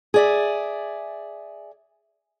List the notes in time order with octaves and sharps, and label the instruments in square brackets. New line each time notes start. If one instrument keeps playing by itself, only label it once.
[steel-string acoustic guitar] G#4 D5 E5